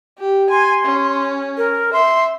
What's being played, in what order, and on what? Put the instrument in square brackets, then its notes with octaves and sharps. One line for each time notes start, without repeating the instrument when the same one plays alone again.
[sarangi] G4
[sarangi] G#5 [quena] C6
[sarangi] C#4
[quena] A#4
[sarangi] E5 [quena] C6